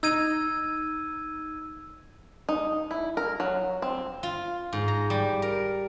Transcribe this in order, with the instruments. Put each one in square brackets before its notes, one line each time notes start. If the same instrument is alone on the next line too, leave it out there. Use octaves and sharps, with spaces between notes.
[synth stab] D#4 [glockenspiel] E6 G#6 D#7
[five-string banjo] D#4
E4
A#4
F#3
C4
[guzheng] F4
G#2
A#5
G3
A#4